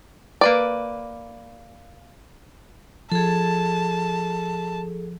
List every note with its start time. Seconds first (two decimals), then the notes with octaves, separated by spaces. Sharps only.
0.41 A#3 B4 D5
3.12 F3 G#4 A4 A5